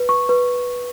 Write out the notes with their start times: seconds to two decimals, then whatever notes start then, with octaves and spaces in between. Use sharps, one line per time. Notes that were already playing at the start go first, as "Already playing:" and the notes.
Already playing: B4
0.09 C#6
0.29 B4